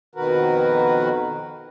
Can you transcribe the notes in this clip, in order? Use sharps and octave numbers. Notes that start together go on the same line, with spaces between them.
F2 B2 D#3 F#4 A#4 B4